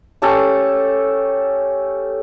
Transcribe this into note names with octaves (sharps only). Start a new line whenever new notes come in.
A3 C#4 G4 A4